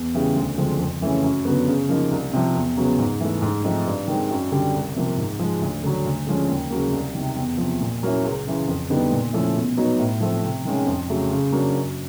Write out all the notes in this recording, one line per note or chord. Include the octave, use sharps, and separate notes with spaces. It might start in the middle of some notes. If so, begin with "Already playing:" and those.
Already playing: E2
C#3 E3 G3
D2
D3 F3 G#3 C4
F2
C#3 E3 A3 C#4
F#2
D3 F#3 B3
C#3
F3 A#3 D#4
C2
C3 F3
E2
C#3 F#3 B3
G#2
E3 A3
G#2
F3 A3 C4 D#4
G2
D#3 G#3 C4
F#2
D3 G3
C2
C3 F3 A#3
G#2
F3 G#3
D2
D3 F#3
D2
D3 F3 G#3 C#4
D#2
C#3 F#3 A#3
C2
C3 D#3
E2
C3 F3
A#2
F#3 A#3 C#4 E4
C#2
C#3 E3
F2
D3 G3 B3 D#4
A#2
F3 A3 C#4 E4
B2
F#3 B3 D#4
A2
F3 A3 C4
C3
D#3 G#3 C#4
F2
C#3 F#3 A3
C#3
F#3 A#3 D4
F#2